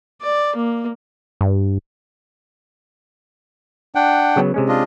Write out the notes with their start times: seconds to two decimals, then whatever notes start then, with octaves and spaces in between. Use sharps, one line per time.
0.22 D5
0.56 A#3
1.41 G2
3.95 D4 F#5 G5
4.36 C#3 F#3 B3
4.54 C3 G#3 C#4
4.69 D4 F4 D#5